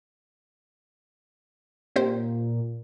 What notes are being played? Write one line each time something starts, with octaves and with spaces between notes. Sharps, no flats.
A#2 C4 G4 C5